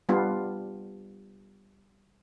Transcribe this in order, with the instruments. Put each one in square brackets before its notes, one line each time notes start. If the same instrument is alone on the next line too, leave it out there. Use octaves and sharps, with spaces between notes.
[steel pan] G3 B3 D4 F4